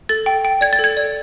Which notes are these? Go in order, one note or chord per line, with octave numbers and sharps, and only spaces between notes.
A4 A6
G5
G5
D5 G#6
A6
A4
G#6
D5